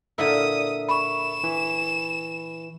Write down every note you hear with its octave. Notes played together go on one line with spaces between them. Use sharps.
A#2 D3 E4 A#4 E5 D#6
B5 C#6 E7
E3